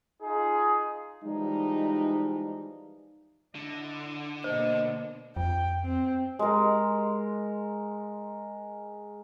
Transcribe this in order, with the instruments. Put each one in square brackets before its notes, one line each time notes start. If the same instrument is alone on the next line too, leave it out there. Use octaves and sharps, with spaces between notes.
[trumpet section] D#4 F4 G#4
[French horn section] E3 F3 G3 G#3 D#4
[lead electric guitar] D3 [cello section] E4 D#5
[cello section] B2 A#3 D4 [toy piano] C5 [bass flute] D#5
[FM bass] F2 [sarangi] G5
[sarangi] C4
[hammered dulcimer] G#3 A#4